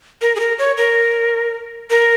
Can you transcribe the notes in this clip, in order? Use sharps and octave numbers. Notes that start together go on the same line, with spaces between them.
A#4
G#4
A#4
C#5
A#4
A#4